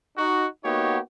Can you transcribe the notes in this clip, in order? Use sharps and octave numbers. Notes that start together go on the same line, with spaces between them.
D#4 F#4
A#3 B3 D#4 F#4 G4 C#5